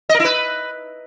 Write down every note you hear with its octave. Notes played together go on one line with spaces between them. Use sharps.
D#5
A#4
E4
B4